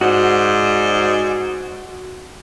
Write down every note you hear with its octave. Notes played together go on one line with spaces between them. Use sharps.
G#2 F#4 C5 D5